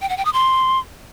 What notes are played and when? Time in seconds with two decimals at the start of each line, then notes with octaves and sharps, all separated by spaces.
0.02 G5
0.09 F#5
0.17 G5
0.25 D#6
0.33 C6